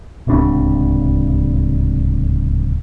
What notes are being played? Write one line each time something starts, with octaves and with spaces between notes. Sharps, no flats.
D1 C#2 C3 D4